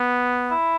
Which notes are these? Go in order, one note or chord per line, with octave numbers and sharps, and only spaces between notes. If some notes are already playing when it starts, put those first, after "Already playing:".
Already playing: B3
E4